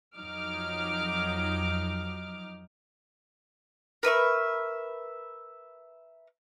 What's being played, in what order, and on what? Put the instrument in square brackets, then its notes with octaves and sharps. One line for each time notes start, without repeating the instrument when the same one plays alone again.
[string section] F2 F#3 D#4 D6 F6
[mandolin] A#4 B4 E5 C#6